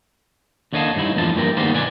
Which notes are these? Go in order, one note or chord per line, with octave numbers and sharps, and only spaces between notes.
D#2 D3 C#5 D#5 F5 A5
G2 D#4 E4
E2 A2 D3 F3 C5 A5
G2 A#3 G4 A#4
D#3 G3 G#3 A#3 B3 C5
B1 B4 D5 G#5